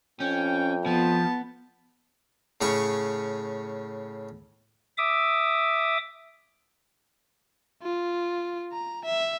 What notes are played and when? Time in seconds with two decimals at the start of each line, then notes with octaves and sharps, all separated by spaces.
0.20 F2 C#4 G5
0.86 F3 B3 A5
2.61 A2 C#3 C#4 C#6
4.98 E5 D6 D#6
7.82 F4
8.73 A#5
9.05 E5